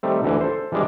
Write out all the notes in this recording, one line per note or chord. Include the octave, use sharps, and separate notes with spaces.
D#3 G3 A3 C4
D2 D3 E3
A4 C5
E3 G3 G#3 D4